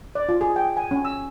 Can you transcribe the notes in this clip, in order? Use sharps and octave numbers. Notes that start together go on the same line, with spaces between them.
D5
F4
G#4
G5
G#5
C#4
E6